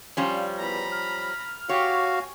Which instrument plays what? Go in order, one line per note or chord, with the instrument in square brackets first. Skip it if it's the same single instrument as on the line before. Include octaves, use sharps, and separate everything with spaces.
[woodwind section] D#2 D5 F5 [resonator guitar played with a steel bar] F3 G3 C#4
[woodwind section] E2 [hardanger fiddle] A#5 B5
[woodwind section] F6
[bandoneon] F#4 F5 [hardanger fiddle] G4 G5 [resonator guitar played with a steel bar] C#5
[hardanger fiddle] G#5